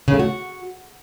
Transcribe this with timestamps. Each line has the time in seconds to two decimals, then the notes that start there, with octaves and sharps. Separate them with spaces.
0.08 C#3
0.14 A3
0.19 F#4